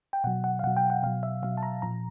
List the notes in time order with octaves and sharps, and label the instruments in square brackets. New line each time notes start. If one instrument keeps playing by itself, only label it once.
[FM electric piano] G5
B2 F#3 F#5
F#5
F5
B2 F#3 F#5
G5
F#5
B2 F#3 F5
E5
B2 F#3 F5
A5
A#5
A#2 F3 A#5